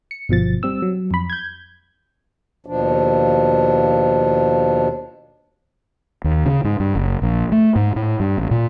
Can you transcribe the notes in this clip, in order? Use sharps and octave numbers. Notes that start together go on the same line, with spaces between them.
C#7
G1 B2 F3 A6
G3 C4 E6
F#3
F2 B5
G6 G#6
D#2 B2 F3 D4
D#2
C#3
G#2
G2
F#1
A#1
A3
G#2
A2
G2
A1
A#2